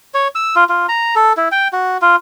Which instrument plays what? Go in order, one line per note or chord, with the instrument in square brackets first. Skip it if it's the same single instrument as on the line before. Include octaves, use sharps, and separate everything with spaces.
[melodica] C#5
E6
F4
F4
A#5
A4
E4
G5
F#4
F4